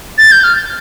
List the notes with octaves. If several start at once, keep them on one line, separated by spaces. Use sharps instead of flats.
A6
G6
F6